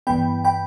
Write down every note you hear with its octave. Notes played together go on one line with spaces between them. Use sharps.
G2 E3 B3 G5 B5
G5 B5